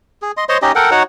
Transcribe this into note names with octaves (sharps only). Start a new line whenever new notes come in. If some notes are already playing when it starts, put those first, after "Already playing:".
G#4
D#5 C6
C5 C#5 D#5 C6
C#4 D#4 G4 D#5
A4 A#4 F#5 G5
D#4 F#4 C#5 F#5